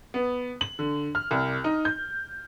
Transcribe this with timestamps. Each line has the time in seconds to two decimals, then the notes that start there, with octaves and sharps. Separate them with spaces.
0.14 B3
0.61 F#7
0.79 D3
1.15 F6
1.31 C2
1.64 D#4
1.85 G6